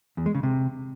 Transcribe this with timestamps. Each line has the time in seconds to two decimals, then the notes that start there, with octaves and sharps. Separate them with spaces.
0.17 E2
0.26 G#3
0.35 C#3
0.43 C3